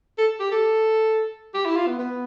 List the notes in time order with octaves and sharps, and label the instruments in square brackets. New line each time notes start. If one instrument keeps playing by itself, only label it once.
[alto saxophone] A4
G4
A4
G4
E4
F4
B3
B3